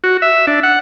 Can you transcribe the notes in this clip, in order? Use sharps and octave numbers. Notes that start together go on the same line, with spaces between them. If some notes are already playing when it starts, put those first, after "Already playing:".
F#4
E5
D4
F#5